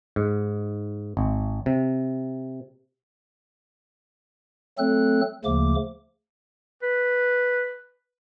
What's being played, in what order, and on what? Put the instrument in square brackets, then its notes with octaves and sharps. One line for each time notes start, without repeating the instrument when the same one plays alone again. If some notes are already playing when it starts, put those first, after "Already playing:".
[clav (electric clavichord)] G#2
G#1
C3
[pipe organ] F#3 A3 C4 A4 F#6
D2 C#3 F3 A3 A#3 D6
[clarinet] B4